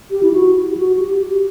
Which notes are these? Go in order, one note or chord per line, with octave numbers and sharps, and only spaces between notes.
G4
E4
F#4
G4
F#4
G4
G4